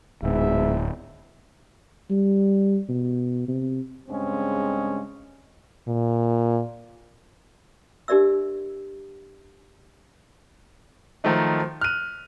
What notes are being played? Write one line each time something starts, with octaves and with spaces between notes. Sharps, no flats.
D1 G#2 B3 E5
G3
B2
C3
G2 C#3 G#3 C4 C#4
A#2
D4 G4 A#4 D5 E5 E6
D#3 F3 F#3 A3 D#4
F6 F#6 D#7